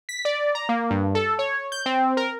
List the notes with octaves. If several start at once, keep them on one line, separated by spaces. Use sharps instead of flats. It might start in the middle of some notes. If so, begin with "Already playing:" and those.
B6
D5
A#5
A#3
G2
A4
C#5
G6
C4
A#4